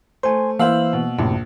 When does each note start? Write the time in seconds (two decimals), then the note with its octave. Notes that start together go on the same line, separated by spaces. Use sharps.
0.23 A3 C5 G#5 C6
0.59 E3 A#3 E4 C5 F5 E6 F#7
0.93 B2
1.19 A#1 F#2 A2 C3